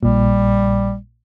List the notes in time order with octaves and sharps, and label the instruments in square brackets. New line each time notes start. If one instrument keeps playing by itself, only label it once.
[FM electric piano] A#1 A#2 [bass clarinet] G3